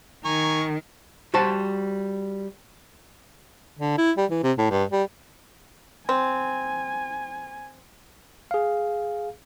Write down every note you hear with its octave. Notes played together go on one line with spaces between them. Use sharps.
D#3 G#5 A#5 C#6
G3 F#4 C5 A5
D3
E4
G3
E3
C3
A2
G2
G3
C4 G#5
G#4 F5